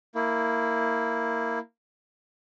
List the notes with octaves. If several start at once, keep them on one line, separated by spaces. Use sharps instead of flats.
A#3 E4